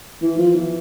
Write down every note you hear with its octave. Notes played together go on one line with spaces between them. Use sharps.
E3
F3
E3